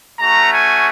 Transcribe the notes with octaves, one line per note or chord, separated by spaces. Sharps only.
A3 C#4 F#4 A#5
G#5